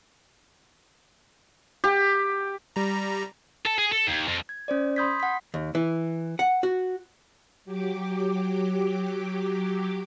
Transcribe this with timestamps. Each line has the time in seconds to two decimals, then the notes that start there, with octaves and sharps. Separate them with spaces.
1.84 G4
2.76 G3 A#5
3.65 A4 A5
3.78 G#4
3.92 A4
4.07 D#2
4.28 F2
4.49 G#6
4.68 C#4 C5 D5
4.96 B5 C6 D#6 G6 G#6 B6
5.20 F#5 B6
5.54 D#2
5.75 E3
6.39 F#5
6.63 F#4
7.65 F#3 G4 D6